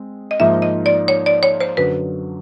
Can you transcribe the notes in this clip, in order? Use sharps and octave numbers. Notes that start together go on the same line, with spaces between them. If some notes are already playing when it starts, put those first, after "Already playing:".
Already playing: G#3 C4
D#5
G#2 F3 A#3 D#4 E5
D#5
D5
C#5
D5
C#5
C5
F#2 D3 F#3 B4